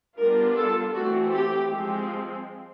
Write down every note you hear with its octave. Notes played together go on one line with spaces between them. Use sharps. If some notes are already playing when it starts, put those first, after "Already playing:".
G3 B3 D4 F4 A#4
A4
E3 A3 C4 F#4
G4
F3 G#3 C4